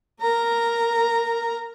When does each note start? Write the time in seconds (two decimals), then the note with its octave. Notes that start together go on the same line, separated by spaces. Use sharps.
0.21 A#4 A#5